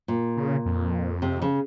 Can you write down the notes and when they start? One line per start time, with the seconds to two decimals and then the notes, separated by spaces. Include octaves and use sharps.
0.08 A#2
0.37 C#3
0.65 F2
1.22 C3
1.42 C#3